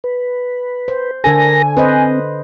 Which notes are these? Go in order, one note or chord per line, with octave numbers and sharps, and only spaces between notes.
B4
C5
D3 D4 A4 A#4 G#5 A#6
C4 B4 C5 D#5